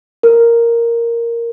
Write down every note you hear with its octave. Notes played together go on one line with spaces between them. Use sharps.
A#4